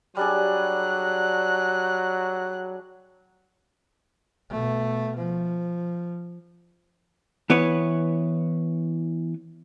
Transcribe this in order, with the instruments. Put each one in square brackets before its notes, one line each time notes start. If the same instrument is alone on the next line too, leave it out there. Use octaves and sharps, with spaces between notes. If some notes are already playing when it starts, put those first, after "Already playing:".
[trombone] F#3 [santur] G3 D4 G#4 [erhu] F#6
[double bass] B2 A3
F3
[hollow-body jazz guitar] E3 B3 B4 C#5